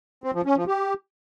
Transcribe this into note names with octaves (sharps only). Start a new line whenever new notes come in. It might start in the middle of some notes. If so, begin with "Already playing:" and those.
C4
F3
C#4
F3
G4